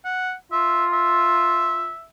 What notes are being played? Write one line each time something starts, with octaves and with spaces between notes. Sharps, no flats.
F#5
F4 E5
E5